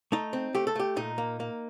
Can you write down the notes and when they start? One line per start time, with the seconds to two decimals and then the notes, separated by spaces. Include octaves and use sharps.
0.12 A3 D#4
0.33 C4
0.55 A3 G4
0.67 A4
0.76 A3 G4
0.96 A#2 D#4
1.18 A#3
1.40 A#3